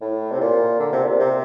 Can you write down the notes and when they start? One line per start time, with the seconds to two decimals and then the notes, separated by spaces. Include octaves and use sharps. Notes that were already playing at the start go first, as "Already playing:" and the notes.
0.01 A2
0.32 C3
0.40 A#2
0.79 D3
0.92 C3
1.06 A#2
1.19 C3